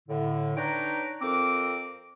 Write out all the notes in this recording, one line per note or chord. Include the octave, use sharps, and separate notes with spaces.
A2 D3
D4 D#4 B4 C#5 G5 A#5
F2 C4 A#4 D6